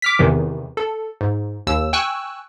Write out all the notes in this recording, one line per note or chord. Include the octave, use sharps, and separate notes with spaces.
D6 F6 B6
E2 C3 D#3 E3
A4
G#2
D#2 E6
G5 G#5 C#6 E6 F#6